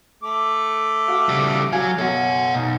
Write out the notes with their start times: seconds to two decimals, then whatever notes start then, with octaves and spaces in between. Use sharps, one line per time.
0.23 A3 D6
1.08 F#4 F5
1.29 C#3 G3
1.72 F#3 F#4 F5 G#5
1.98 F#2 B2 A4 F#5
2.54 B1 D#4